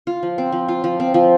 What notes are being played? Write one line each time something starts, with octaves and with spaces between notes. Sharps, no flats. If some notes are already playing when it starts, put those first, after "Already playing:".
F4
F3
C4
F3
F4
F3
C4
F3